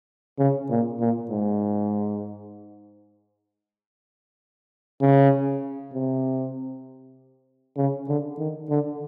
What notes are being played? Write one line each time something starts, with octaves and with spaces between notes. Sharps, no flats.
C#3
A#2
A#2
G#2
C#3
C3
C#3
D3
D#3
D3